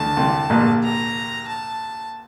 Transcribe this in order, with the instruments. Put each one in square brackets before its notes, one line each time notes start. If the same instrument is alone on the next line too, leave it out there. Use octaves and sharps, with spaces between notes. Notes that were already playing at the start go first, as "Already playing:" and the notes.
Already playing: [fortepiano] D2 D3 [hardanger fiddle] A5
[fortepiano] C2 C3
A#1 A#2
[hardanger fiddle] A#5
A5